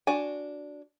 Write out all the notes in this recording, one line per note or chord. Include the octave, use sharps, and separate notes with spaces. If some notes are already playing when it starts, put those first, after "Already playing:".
D4 F#4 G#5